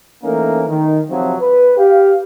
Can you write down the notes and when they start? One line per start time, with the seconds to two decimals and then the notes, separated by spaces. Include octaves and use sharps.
0.23 E3 A3 A#3 C#4 D#4 A#4
0.68 D#3
1.09 C3 F3 F#3
1.40 B4
1.77 G4 F5